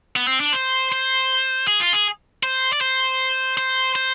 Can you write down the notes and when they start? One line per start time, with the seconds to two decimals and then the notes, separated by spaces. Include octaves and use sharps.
0.16 B3
0.28 C4
0.40 D4
0.53 C5
0.92 C5
1.67 G#4
1.80 F4
1.93 G#4
2.43 C5
2.73 D5
2.81 C5
3.57 C5
3.95 C5